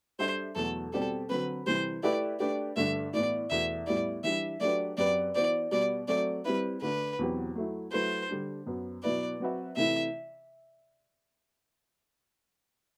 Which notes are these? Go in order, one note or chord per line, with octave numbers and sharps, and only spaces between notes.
G3 D4 A4 C5 E5
E2 B2 F#3 A3 A4
B2 G3 C4 G4 A4 D5
D3 F#3 C4 B4
C3 E3 G3 C5
A3 E4 G4 B4 D5 E5
A3 D4 G4 B4 D5
G2 D3 A3 D4 E5
A2 E3 B3 D5
E2 B2 A3 E5
A2 G3 B3 E4 D5
E3 G3 D4 E5
F#3 A3 D4 G4 B4 D5
F#2 F#3 C4 G4 B4 D5
E3 B3 F#4 C5 D5
B2 G3 B3 D5
F#3 A3 C4 D5
G3 C4 E4 B4
D3 A3 D4 B4
E2 B2 F#3 C4 G4
F#3 A3 E4
F#3 A3 E4 B4 C5
D3 G3 D4
F#2 F#3 B3
B2 F#3 B3 E4 B4 D5
F#3 C4 F#4 B4 E5
C3 E3 A3 E4 E5